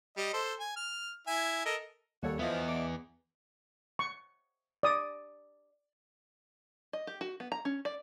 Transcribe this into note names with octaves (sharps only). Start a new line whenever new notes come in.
G3 D#5
A4 C5
G#5
F6
E4 E5 G#5
A4 A#4 D#5
D#2 C#3 G3 F#4 A4 C#5
E2 F3 B3 D#5 E5
A4 D5
C#6
D5 D#6
D#5
G4
F#4
B3
A#5
C#4
D5